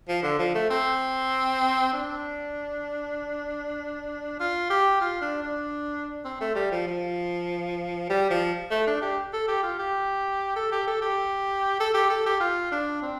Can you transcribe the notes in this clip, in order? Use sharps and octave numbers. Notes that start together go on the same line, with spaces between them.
F3
D3
F3
A3
C4
D4
F4
G4
F4
D4
D4
C4
A3
G3
F3
F3
G3
F3
A3
D4
G4
A4
G4
F4
G4
A4
G4
A4
G4
A4
G4
A4
G4
F4
D4
C4